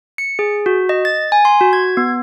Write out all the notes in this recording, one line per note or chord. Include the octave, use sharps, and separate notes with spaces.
C#7
G#4
F#4
D#5
A6
G#5
C6
F#4
G#6
B3